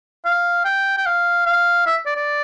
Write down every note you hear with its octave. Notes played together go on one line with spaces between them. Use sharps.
F5
G5
G5
F5
F5
E5
D5
D5